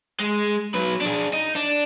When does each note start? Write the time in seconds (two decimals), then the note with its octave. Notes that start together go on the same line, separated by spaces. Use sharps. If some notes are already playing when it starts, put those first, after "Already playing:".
0.20 G#3
0.74 F#3 B4
1.01 D4 G#4
1.33 D#4
1.56 D4